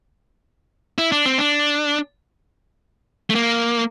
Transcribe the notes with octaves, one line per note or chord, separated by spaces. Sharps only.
E4
D4
C4
D4
A3
A#3